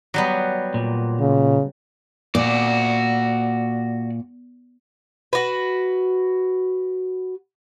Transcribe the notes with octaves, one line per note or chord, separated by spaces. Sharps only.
F#3 G3 B3
A#2
C#3
A#2 F#4 D5
F#4 B4